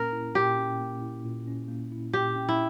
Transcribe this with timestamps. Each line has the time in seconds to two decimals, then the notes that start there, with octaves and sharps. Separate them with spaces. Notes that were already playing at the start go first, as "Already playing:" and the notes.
Already playing: A#2 A#3 C#4 A#4
0.13 E4
0.35 A#2 G4
0.58 C#4
0.80 A#3
1.02 E4
1.25 A#2
1.47 C#4
1.68 A#3
1.92 E4
2.13 A#2 G4
2.36 C#4
2.49 E4